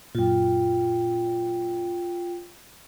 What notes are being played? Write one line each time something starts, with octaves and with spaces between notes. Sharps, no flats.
F#2 A#2 F4 G5